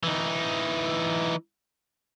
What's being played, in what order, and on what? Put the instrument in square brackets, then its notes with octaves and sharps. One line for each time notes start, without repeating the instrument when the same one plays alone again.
[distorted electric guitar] E3 D#4